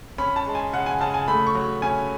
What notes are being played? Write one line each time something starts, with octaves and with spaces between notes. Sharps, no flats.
C#4 B5
A5
G#3
G#5
C#3 F#5
G#5
C#3 A5
G#5
A3 B5
C#6
F#3
C#4 G#5